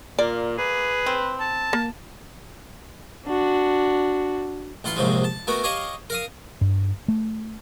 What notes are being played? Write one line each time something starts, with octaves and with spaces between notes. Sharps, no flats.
A#2 A#3 D5
G#4 B4
C4
A5
A#3
D4 F#4
A1 F4 F#5 B5 C6
A#1 G#2 C3 F3 F#3 G#3
A5
A3 B3 F#4 A#4
G4 C#5 D#5 F5
A#4 F5 D#6
G2
A3